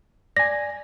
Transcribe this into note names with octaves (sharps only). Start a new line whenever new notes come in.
D5 G#5 A#6